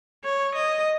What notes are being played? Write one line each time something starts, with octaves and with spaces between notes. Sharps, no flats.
C#5
D#5